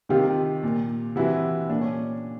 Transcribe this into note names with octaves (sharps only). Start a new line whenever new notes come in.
C3 D#3 F4 G4
A#2
C3 E3 E4 F#4
A#2 D4
C#4